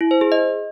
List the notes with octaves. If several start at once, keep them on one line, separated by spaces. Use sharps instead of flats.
E4
C5
G#4
D#5